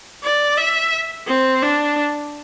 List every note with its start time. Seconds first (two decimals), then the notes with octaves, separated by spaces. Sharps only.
0.23 D5
0.57 E5
1.27 C4
1.63 D4